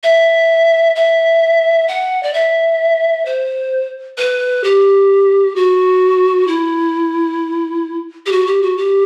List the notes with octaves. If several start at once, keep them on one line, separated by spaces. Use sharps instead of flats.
E5
E5
F#5
D5
E5
C5
B4
G4
F#4
E4
G4
F#4
G4
F#4
G4